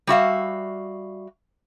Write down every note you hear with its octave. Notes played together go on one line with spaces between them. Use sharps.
G3 F#4 E5 F5